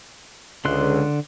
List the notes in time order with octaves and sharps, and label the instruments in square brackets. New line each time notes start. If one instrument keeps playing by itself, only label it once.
[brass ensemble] C#2 [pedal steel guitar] D3 C6 F#6